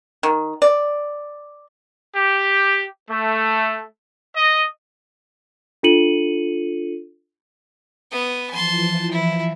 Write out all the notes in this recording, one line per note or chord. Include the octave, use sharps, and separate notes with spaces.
D#3
D5
G4
A3
D#5
D4 F4 A4 C#7 D#7 F#7
B3 D#6
E3 F3 A5 C6
E4